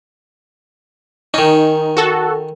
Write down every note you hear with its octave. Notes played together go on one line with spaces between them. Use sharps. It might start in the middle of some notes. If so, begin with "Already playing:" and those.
D#3 C#4 D#4
F#4 A4